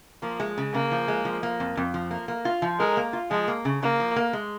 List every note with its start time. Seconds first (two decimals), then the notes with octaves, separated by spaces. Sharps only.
0.22 F3 A#3
0.40 G#3
0.58 C#3
0.74 C#3 A#3
0.91 F3
1.08 G#3
1.25 F3
1.43 A#3
1.60 F2
1.77 F2
1.94 F3
2.11 A#3
2.28 A#3
2.45 F4
2.62 F3
2.80 G#3 A#4
2.97 A#3
3.13 F4
3.31 F3 G#3
3.48 A#3
3.65 C#3
3.82 C#3 A#3
4.00 F3
4.16 A#3
4.33 G#3